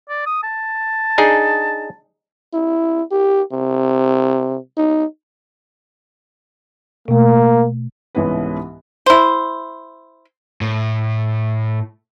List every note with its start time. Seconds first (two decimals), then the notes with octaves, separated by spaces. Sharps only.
0.09 D5
0.26 D#6
0.43 A5
1.18 D4 D#4 G#4
2.54 E4
3.11 G4
3.52 C3
4.77 D#4
7.08 B2 A3 A#3
8.15 C2 G#2 E3 B3 C#4 B4
9.06 E4 C5
10.61 A2